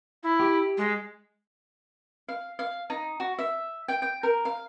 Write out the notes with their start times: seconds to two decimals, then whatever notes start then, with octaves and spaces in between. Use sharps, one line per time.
0.23 E4
0.40 G4
0.77 G#3
2.28 F5
2.59 F5
2.90 D#4
3.20 F#4
3.39 E5
3.88 G5
4.02 G5
4.23 A#4
4.45 F5